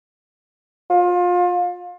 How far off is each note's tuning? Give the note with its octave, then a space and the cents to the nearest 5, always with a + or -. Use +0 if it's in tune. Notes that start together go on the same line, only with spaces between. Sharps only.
F4 +30